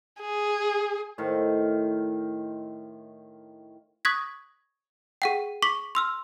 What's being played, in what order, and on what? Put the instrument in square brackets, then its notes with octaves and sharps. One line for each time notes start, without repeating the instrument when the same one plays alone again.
[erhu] G#4
[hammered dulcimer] A2 D#3 C5 F5
[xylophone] C#6 D#6 F#6 G#6 A#6 B6
G#4 F#5 G5
C#6 D6 B6
C6 E6 F6